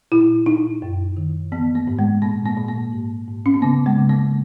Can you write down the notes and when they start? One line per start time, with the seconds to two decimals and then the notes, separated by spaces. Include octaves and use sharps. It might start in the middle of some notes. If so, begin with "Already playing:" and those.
0.12 A#2 E4
0.46 A#2 D#4
0.82 F#2
1.17 D#3
1.52 E3 B3
1.75 A#3
1.88 G#2
1.99 G#3
2.22 A#2 A#3
2.46 A#3
2.57 A#2
2.69 A#3
2.93 G#2
3.28 G#2
3.46 C#4
3.54 B3
3.62 C#3 A#3
3.86 G#3
3.98 C#3
4.10 A#3